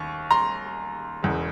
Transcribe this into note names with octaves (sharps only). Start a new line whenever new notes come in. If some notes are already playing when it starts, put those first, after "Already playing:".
Already playing: D#2 C#6
A#5 C6
E1 E2 C#3